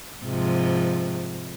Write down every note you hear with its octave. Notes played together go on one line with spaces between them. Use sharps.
G#2 C3 F3